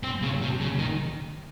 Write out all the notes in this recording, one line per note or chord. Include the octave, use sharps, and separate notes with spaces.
C4
C#3
C3
C#3
D#3